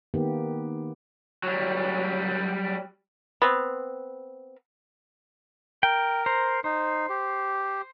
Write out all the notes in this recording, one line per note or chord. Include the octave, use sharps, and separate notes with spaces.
D#3 A#3 B3 G4
F#3 G3
B3 C4
A#4 G5
C5 A#5
D#4 C5
G4